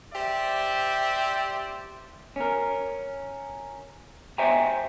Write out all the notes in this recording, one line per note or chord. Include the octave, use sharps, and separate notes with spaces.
G4 C5 D5 E5
C#4 A#4
C5 E5 G5 G#5 A#5